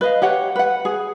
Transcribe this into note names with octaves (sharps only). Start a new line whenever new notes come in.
B4 D#5 F5
G4 C#5 F#5
B4 F#5
G#4